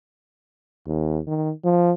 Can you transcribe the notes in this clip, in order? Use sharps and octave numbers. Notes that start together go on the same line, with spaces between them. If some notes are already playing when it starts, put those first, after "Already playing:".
D#2
D#3
F3